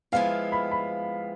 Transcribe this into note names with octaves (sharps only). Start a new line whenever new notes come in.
F3 G#3 B3 E4 F5
B5
B5